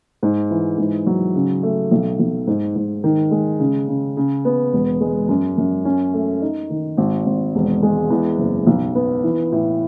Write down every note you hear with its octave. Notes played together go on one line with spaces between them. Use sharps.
G#2
E3
G#2
F#3
C#3
A3
B1
B1
G#2
G#2
D#3
G#3
C#3
C#3
C#3
B3
E1
G#3
F#2
F#2
C#4
A3
D#4
D#3
G#1
G#1
E1
G#3
E2
F#1
B1
B3
E3
A2